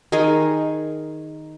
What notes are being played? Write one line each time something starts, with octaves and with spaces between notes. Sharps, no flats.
D#3 D#4 G#4 A#4